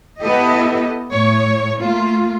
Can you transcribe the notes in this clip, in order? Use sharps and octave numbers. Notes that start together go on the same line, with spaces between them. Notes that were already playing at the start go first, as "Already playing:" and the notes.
B3 E4 G4 A4 D#5
A2 C#5
A3 A#3 F4